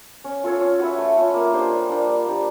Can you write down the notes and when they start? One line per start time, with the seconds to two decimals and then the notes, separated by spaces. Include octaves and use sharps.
0.24 C#4
0.44 F4 A4 C#5
0.61 C#4
0.79 F#4 B4 E5
0.98 A3
1.17 C#4 F4
1.34 A#3
1.53 D4 G4 C5
1.72 G3
1.89 A#3 D4
2.08 G3
2.26 A#3 D4 G4